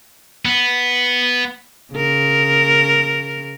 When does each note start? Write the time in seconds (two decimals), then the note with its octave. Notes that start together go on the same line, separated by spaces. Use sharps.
0.45 B3
1.93 C#3 A#4